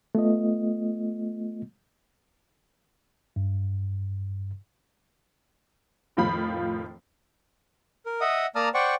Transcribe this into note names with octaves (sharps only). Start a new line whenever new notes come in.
A3 B3 F4 D#5
G2
F1 A2 D#3 F3 F4 B5
A#4
D#5 E5 F#5 D#6
A#3 D5 A5 A#5 D#6 F6
C5 D5 F#5 G5 C#6